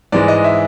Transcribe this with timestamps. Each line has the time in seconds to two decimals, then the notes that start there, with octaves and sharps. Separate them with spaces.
0.12 G#2 E3 G#3 D5
0.28 D#5
0.44 E5